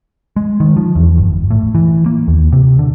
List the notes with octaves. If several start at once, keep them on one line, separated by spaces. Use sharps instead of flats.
G#3
D#3
F3
E2
G1
A2
E3
A#3
D#2
C3
D3